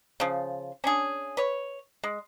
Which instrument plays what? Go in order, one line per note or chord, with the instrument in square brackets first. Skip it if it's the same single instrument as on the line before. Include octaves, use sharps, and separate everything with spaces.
[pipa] C#3 F3
C#4 D4 G#4
B4 C#5
G#3